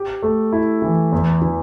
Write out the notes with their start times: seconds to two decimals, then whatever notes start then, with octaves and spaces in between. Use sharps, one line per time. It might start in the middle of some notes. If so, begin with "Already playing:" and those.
Already playing: G4
0.23 A3
0.53 E4
0.82 E3
1.12 E2
1.41 E3